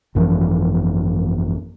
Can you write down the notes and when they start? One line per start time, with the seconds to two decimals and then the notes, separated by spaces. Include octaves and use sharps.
0.15 G#1 F#2 E3 F3